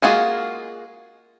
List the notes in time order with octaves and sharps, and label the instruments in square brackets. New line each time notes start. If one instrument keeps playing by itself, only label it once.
[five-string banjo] G#3 A#3 F4 F#4 G#4